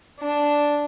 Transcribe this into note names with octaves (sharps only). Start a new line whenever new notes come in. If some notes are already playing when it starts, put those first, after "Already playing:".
D4